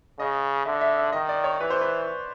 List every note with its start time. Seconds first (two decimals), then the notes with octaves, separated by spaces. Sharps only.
0.19 C#3 D#5
0.65 D3 E5
0.81 E5
0.98 E5
1.12 D#3 D#5
1.29 D5
1.44 C#5
1.60 E3 B4
1.70 C5
1.81 B4